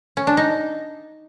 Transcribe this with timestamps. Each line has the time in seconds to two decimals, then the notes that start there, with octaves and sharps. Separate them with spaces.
0.17 C#4
0.27 D4
0.37 D#4